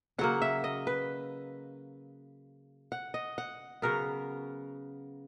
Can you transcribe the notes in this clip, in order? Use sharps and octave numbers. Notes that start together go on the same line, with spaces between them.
C#3 F#3 A#3 F#5
E5
D#5
B4
F#5
D#5
F#5
C#3 F#3 B3 A#4